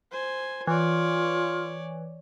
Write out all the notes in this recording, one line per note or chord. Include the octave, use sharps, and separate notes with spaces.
C5 G#5
E3 F4 C#5 D5